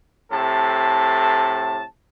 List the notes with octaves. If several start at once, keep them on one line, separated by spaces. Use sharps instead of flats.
A2 C3 A4 A5